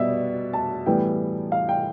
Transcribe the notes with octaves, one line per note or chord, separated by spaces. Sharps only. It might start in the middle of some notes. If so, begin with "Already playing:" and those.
Already playing: B2 G3 B3 D5 E5
A5
A2 E3 G3 B3 G5
F5
G5